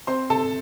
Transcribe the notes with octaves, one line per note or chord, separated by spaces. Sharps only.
C4 C5 C6
C3 A4 A5